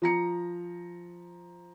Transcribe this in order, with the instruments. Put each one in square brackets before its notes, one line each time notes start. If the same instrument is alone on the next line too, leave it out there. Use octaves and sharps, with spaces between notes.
[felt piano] F3 A#5 C#7